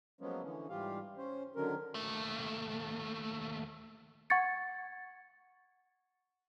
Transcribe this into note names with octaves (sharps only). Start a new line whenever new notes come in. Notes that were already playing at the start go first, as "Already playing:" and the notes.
F3 F#3 G#3 A#3 B3 C#4
D3 E3 C#4
G#2 E3 G3 F4 G4 F5
C#4 C5
D3 D#3 F#3 C#4 A#4
D#2 A3
F#5 C#6 G#6 A6 C#7